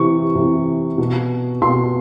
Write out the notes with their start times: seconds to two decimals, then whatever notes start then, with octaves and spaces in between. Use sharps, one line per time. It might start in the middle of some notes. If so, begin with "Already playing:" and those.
Already playing: C3 E3 C#6
0.35 C3 E3
0.98 B2
1.62 B2 C6